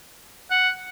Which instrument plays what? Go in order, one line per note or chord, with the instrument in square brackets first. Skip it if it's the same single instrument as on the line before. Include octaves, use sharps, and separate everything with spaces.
[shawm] F#5